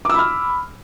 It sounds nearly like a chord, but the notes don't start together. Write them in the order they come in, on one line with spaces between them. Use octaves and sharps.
D6 E6 B5 F6